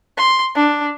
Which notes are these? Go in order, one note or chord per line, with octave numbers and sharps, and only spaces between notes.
C6
D4